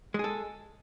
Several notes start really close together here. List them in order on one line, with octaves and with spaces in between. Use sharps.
G#3 G#4 A4